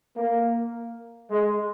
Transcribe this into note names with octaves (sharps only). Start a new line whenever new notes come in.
A#3
G#3